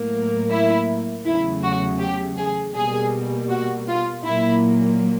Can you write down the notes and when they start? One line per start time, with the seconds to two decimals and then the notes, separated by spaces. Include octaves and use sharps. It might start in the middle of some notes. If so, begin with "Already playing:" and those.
Already playing: A2 F#3 A#3
0.50 E4
1.24 E2 C#3 F#3 A3 E4
1.63 F#4
1.99 G4
2.37 G#4
2.75 B2 G3 A#3 G#4
3.49 F#4
3.88 F4
4.24 A#2 F#3 A#3 E4